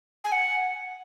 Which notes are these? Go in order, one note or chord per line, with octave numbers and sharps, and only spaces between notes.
G#5
F#5